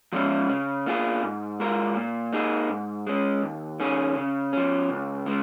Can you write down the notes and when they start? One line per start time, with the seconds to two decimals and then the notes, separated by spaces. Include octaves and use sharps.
0.13 F3 G#3 C#4
0.49 C#3
0.86 A#3 F4 G#4
1.23 G#2
1.60 G#3 F4 A#4
1.96 A#2
2.33 A#3 D#4 G#4
2.70 G#2
3.07 G#3 C#4
3.43 D#2
3.80 D#3 C#4 G#4
4.16 C#3
4.53 F3 C#4
4.90 C#2
5.26 C#3 G#3